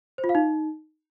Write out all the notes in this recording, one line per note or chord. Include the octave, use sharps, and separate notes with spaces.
C5
F4
F5
D#4